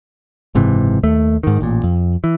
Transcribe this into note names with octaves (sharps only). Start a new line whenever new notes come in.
F#1 G#2 C3 E3
D#2 A3
G#2 D#3
A1 A#2
F2
E3